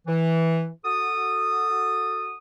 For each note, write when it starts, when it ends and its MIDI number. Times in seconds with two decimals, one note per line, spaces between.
0.07 0.69 52
0.85 2.37 66
0.85 2.37 69
0.85 2.37 87